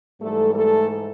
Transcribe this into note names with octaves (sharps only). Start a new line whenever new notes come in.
G#2 E3 G3 A3 A4
A3 A4